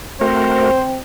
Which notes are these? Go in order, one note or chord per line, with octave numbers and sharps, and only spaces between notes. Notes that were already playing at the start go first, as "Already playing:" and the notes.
A3 C4 F#4 A#4 C5